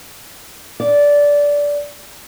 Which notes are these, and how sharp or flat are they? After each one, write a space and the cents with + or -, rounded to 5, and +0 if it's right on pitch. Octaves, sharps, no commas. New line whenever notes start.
D5 -15